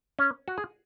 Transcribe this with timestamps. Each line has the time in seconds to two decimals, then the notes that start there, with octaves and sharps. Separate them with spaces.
0.19 C#4
0.48 F#4
0.58 G#4